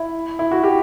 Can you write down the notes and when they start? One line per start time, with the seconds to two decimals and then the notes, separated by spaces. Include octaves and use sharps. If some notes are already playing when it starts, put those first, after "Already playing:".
Already playing: E4
0.39 E4
0.52 F#4
0.63 G4